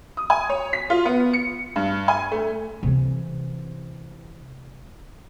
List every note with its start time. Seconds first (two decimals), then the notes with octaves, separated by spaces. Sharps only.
0.17 D#6
0.30 G#5
0.50 C#5
0.73 B6
0.90 F4
1.05 B3
1.33 C#7
1.76 G2
2.08 G#5
2.32 A3
2.83 C3 E3